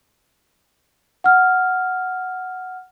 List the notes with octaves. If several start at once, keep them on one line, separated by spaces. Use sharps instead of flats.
F#5 F6